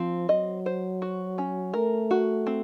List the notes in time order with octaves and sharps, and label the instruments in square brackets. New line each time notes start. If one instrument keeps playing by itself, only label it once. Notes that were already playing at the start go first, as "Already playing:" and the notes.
Already playing: [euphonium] F3 [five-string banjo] C4
[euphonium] F#3 [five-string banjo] D#5
[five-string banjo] C5
F#4
C#4
[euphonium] A3 [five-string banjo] A#4
[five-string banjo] F#4
C4